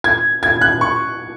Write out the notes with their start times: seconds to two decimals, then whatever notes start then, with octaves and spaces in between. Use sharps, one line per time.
0.04 G#6
0.43 G#6
0.61 F#6
0.81 C#6